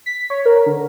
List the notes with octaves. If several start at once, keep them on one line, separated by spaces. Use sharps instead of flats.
B6
C#5
A#4
D3